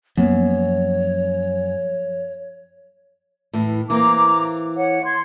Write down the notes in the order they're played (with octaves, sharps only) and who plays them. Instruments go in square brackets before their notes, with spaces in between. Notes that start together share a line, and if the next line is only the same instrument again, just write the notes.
[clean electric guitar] F#2 [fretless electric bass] F3 A#3 B3 [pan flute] C#5
[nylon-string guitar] A2 E3
[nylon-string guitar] E3 A#3 C4 [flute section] A#5 D6
[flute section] C#5 F#5
C6 G#6